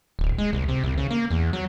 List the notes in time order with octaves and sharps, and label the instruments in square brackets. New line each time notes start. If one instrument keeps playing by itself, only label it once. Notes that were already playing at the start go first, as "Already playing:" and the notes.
[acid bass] D1
G#3
C2
C3
C2
C#3
A#3
E2
F#3